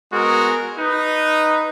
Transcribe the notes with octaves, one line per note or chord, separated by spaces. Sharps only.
G#3 B3 F#4 A#4
D#4 B4